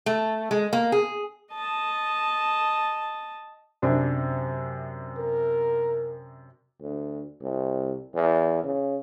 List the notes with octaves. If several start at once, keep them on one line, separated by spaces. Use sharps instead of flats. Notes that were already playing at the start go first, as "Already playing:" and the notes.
A3
G#3
A#3
G#4
D#5 A5
F#2 C3 D4
A#4
D2
C2
E2
C#3